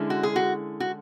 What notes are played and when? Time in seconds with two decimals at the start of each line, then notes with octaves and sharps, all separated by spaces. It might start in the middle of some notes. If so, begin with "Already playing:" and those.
Already playing: D3 G#3 C#4 E4
0.10 F#4
0.23 G#4
0.36 F#4
0.80 F#4